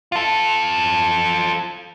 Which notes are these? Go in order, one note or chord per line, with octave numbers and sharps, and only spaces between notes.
F4 A4